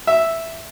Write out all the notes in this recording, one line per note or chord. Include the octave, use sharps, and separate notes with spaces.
E5